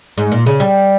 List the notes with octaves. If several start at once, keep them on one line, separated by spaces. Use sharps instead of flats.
G#2
A#2
C#3
G3